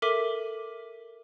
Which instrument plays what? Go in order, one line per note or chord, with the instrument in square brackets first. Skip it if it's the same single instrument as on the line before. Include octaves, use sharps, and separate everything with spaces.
[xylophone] A4 A#4 E5 D6 B6 D#7